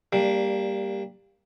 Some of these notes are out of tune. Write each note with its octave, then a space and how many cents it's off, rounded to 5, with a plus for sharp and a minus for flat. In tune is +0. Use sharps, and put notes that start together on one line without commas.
G3 +10 A#3 +0 D4 -10